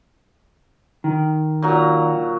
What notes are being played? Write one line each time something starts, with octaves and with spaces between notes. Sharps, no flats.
D#3
A#2 F#3 A#5